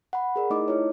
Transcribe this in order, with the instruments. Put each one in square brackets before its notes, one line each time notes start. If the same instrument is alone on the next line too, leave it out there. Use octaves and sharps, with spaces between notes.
[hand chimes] F#5 B5
G#4 A#4 D5
A3 D#4 E4 D#5 D6
E4 F4 C#5